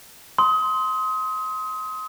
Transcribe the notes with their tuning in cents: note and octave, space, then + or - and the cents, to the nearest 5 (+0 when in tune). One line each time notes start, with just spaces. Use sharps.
C6 +0 D#6 +30